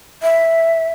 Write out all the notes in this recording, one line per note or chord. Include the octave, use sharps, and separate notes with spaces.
E5